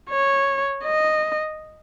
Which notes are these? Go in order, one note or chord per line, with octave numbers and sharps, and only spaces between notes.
C#5
D#5